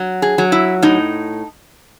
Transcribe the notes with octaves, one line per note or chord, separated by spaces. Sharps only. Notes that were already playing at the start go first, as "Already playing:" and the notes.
Already playing: F#3
G#4
F#3
E4
A2 D#4